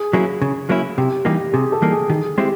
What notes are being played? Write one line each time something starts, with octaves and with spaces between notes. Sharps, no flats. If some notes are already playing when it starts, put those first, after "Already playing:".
Already playing: G#4
F#3 A#3 C#4 E4
C#3
F#3 A#3 C#4 E4
C3 G4
E3 G3 A#3 D#4 G4
C3 G#4
A4
E3 G3 A#3 D#4
G#4
D#3 G#4
G#3 C4 E4 G4